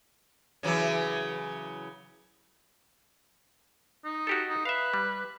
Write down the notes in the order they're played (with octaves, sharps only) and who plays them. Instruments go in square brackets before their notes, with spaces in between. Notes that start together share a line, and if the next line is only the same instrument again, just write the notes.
[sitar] C#3 E3 F#3
[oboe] D#4
[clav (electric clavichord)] F#4 G4 A4
[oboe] D#4
[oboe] B4 [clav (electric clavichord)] E5 F5
[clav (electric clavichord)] G3